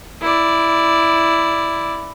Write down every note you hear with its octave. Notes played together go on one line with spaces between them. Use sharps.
E4 D5